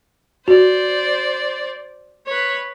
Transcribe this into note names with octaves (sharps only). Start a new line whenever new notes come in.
F#4 C5 D5
B4 C#5